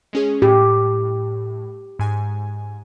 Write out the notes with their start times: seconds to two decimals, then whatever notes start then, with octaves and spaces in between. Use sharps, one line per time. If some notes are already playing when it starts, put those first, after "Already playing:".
0.13 G#3 C#4 G#4
0.42 A2 G4
1.99 G#2 G#5